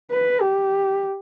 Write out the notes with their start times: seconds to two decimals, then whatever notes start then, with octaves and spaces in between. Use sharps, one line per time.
0.12 B4
0.41 G4